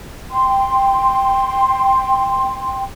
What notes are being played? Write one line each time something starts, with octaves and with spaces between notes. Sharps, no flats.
G5 C6